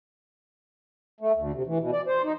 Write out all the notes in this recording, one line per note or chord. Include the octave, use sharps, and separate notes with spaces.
A3
D2
C3
E3
B2
D5
C5
D#4